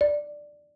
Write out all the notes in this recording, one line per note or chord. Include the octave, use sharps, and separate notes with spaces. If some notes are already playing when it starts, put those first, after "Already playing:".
D5